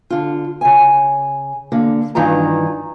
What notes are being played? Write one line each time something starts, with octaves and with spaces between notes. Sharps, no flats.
D3 F4
C#3 G#5
D3 A#3
G2 D#3 E3 F4 A#5